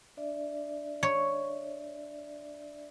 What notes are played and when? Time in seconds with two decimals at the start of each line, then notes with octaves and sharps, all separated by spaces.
0.17 D4 D5 E5
1.03 C#5